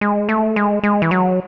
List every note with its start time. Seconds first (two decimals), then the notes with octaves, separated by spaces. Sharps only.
0.01 G#3
0.29 A3
0.56 G#3
0.83 G#3
1.02 E3
1.11 F#3